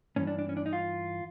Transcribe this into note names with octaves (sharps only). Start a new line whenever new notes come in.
G2 E3 C#4
D4
D4
C#4
D4
D#4
F4